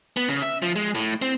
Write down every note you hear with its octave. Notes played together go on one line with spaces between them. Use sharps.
B3
C#3
E5
F3
G#3
A2
C4